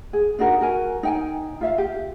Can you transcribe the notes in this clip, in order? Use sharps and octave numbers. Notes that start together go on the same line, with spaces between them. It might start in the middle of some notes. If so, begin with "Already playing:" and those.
G#4
D4 D#4 F#4 A#4
F#4 A#4 G#5
D#4 G5 G#5
F4 E5 F5
G4